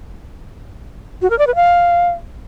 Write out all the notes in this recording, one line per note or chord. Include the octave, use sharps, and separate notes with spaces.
F#4
A#4
D5
B4
F5